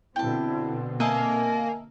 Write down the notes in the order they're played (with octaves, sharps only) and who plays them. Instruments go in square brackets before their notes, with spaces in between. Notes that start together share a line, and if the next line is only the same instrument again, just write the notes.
[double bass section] B2 D3 C4 [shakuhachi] E4 [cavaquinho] G5 A5
[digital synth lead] A#3 [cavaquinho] D#5 E5 A5 [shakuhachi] G#5